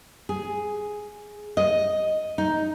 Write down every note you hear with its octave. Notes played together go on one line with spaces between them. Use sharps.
G#4
D#5
D#4